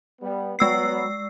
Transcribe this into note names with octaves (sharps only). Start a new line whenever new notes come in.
G3 B3
F#3 G#3 B3 E6 C7